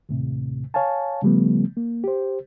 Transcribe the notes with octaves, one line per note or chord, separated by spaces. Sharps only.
D#2 A2 C3
C#5 F5 G#5 A5
C#3 F3 G3 A3 B3
A#3
G4 C5